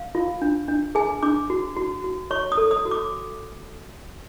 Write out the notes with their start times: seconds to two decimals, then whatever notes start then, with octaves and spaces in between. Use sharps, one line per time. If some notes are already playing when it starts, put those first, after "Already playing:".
Already playing: F5
0.15 F4
0.42 D4
0.68 D4
0.95 G#4 G#5
1.23 D4 D6
1.50 F#4
1.77 F#4
2.04 F#4
2.31 C#5 C#6
2.52 D#6
2.57 A4
2.71 D#6
2.85 F#4
2.91 D6